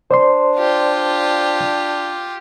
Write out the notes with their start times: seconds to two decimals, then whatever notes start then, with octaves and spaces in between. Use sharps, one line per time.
0.11 D4 C5 D5 C6
0.56 F4 G4